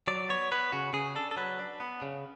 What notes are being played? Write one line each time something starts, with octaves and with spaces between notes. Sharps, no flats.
F#3 D5
B3 C#5
B3 B4
C#3 F#4
C#3 G#4
D4 A4
A4
F#3 B4
D4
B3
C#3